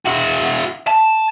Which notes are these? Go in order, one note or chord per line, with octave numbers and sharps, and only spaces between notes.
E4 F#4
A5